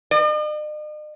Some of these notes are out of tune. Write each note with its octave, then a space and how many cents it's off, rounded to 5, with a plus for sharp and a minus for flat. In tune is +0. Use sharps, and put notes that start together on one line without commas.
D#5 -45